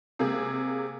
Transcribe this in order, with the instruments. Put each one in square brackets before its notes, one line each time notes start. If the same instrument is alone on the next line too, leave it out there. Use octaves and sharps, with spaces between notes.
[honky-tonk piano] C3 G#3 A#3 G#4